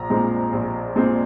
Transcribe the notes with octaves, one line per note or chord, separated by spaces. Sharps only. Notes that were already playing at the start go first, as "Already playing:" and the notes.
Already playing: A#1 A#5
A#2 G#3 C4
A#1
A#2 G#3 C4